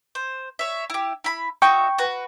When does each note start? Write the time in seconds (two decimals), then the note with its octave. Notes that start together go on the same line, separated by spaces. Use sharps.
0.15 C5
0.59 C#5 E5
0.90 E4 G4
1.24 E4 B5
1.62 D#4 F#4 E5 G5 C#6
1.98 F#4 B4